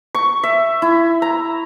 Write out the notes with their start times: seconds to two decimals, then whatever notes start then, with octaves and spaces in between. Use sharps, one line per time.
0.15 C#6
0.43 E5
0.82 E4
1.22 A#5